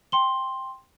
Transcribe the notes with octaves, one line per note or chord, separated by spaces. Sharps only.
G5 C6 G7